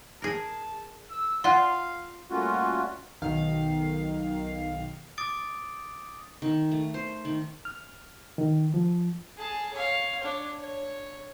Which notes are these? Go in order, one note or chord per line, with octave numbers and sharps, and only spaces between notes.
G#4 A#4 A5
E6
F4 D5 F5 F#5 C6 F#6
G3 A3 A#3 C#4 F4 F#4
B1 D#3 F5
D6 D#6 A6 D7
D#3
A3
C5
D#3
F6
D#3
F3
G#4 A5
C#5 F5
D4 C#5
C#5